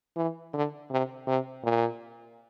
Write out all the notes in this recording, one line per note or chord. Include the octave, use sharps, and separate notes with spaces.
E3
D3
C3
C3
A#2